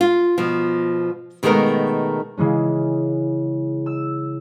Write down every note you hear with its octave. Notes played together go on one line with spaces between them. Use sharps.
F4
B2 F3
B2 D#3 G#3 A3 B3 A#4
C#3 E3 G#3 C#4
E6